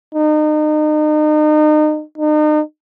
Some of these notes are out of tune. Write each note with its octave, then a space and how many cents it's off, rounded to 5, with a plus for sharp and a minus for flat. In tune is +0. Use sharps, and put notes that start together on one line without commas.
D#4 -35
D#4 -40